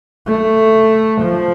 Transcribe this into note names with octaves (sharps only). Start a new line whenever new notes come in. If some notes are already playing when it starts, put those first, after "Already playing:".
A3
F3